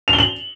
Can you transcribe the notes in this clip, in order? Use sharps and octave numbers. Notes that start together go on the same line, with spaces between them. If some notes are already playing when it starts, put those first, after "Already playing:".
F7
G7
F#7